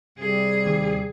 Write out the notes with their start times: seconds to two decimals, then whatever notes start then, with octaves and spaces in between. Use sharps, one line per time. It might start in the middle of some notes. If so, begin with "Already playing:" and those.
0.19 C3 G3 G#4
0.66 D#2